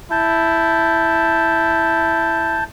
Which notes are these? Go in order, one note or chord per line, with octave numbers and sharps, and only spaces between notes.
E4 A5 G6